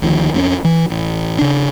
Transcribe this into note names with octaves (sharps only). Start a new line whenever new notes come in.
D2 D#3 F3
F2 B3 C#4
E3
A1
C#3 D4